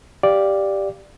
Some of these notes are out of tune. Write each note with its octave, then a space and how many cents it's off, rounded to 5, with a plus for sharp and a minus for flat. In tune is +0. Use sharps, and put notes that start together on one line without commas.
G4 +0 D5 +0 F5 -5